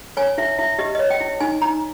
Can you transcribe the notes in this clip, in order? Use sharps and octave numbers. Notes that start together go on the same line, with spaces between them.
C#5 G#5
E4 E5
E4 E5
G4 D#5
D#5
C#5
G5
E4
D#4 G#5
D#4 A#5